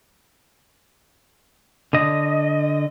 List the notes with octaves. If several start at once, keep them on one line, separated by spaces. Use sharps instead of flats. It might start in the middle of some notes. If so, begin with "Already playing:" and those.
D3 D#5